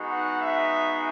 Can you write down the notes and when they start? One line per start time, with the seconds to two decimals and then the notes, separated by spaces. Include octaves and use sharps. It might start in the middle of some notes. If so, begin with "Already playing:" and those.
Already playing: G#3 B3 D#4 F#4
0.10 F#5
0.40 E5